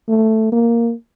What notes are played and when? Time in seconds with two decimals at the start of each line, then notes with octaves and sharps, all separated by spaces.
0.09 A3
0.52 A#3